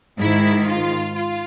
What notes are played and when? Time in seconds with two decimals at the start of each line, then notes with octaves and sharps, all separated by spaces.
0.19 G#2 D#3 E4
0.67 F4
1.14 F4